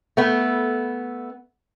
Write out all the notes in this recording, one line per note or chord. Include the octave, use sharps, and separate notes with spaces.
A3 B3